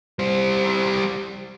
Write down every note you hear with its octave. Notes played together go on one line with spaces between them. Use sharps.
G3 C5